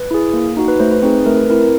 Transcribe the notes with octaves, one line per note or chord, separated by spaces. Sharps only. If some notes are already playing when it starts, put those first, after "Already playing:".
Already playing: B4
E4 G#4
A#3
D#4 F#4
B4
A3 C5
B4
C4 D#4 G#4
B4
A3 A#4
B4
C4 E4 A#4
A#4